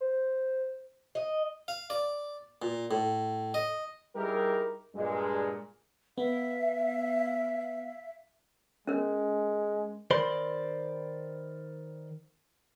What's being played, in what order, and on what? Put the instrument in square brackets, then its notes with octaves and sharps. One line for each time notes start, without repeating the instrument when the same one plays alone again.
[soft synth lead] C5
[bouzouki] D#5
[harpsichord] F5
D5
A#2
A2
D#5
[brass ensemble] G3 D#4 E4 G4 G#4 A#4
G2 A#2 G#3
[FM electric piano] B3 [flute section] E5 F5
[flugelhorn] G#3 [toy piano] C#4 A#4
[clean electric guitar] D#3 A#4 C5 D5 B5 C6